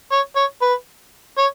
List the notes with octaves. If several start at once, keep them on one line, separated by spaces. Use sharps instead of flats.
C#5
C#5
B4
C#5